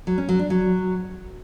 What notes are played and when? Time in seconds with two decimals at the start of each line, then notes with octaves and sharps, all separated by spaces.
0.07 F#3
0.18 C#4
0.29 F#3
0.39 D4
0.50 F#3